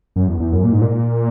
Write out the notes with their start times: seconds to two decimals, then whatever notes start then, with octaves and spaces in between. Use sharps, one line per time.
0.16 F#2
0.28 E2
0.40 E2
0.52 F#2
0.64 A#2
0.73 G#2
0.81 A#2